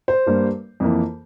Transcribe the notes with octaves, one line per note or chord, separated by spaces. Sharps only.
C5
G2 G3 A#3
F2 E3 A#3